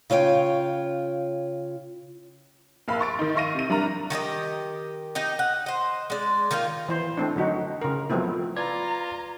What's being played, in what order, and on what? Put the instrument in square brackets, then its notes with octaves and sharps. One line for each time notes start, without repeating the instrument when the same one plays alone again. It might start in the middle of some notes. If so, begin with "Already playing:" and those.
[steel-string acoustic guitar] C#3 F4 C#5 E5 G5
[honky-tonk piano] A#1 A#3 F5 B5
C6 C#6 A6 D7
D#3 D#4
E5 F5 C#6 A#6 D#7
C3 D#7
G3 D4 E4 A#4 A#5
[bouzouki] D#3 G4 G#4 D#5
D#4 G4 D#5
F#5
C5 D#5
G#3 D5
D#3 A#3 D#4 F4
[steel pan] E3 C5
A3 C4 D4
D3 F#3 D#4 F#4
C#3 A#4
F3 F#3 A3 B3 C4 E4
[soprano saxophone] F4 [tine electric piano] B4 D5 G#6 [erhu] A#5